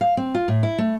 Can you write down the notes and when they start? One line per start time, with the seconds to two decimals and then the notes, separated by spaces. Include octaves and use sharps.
0.01 F5
0.17 C4
0.34 F4
0.48 A2
0.63 E4
0.78 A3